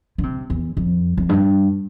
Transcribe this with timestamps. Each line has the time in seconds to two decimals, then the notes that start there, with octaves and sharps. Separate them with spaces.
0.18 D3
0.23 C3
0.50 E2
0.77 F2
1.17 F2
1.29 G2